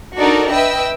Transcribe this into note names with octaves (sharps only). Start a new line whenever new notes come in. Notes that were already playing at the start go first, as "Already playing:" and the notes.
D4 D#4 F#4 A4 A#4 D5
B4 D#5 E5 G5 E6